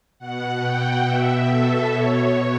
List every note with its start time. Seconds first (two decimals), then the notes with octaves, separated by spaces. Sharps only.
0.19 B2 F#5
0.62 G5
1.05 B2 E5
1.49 A4
1.92 B2 C#5